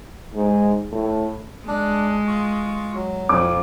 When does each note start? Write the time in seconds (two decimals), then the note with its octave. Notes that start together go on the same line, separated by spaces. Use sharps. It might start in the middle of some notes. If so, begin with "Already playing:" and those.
0.35 G#2
0.92 A2
1.68 G#3 D4
2.28 F4 C#6
2.94 F#3
3.29 F2 D6